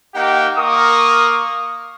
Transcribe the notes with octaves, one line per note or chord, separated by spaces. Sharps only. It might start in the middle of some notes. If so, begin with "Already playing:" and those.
A#3 D#4 G4 F#5 G5
A#3 A#4 C#6 D#6